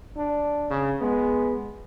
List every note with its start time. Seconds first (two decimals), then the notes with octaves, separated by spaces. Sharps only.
0.17 D4
0.70 C#3
1.01 G#3 B3